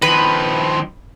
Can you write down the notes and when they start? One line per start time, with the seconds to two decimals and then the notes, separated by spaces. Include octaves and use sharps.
0.02 D#3 F3 B4